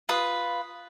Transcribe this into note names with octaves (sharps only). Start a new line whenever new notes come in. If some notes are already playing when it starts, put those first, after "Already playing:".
F4 B4 D#6